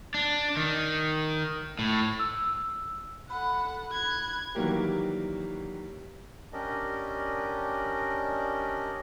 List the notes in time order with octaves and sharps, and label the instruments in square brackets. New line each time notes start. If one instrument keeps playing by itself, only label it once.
[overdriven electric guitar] D4
D#3
A2
[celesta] E6
[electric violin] A4 F#5 [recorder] B5
[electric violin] F#6 G#6
[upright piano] D#3 E3 F#3 G3 A#3 G4
[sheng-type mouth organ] C#4 D4 G4 A#4 D5 D#5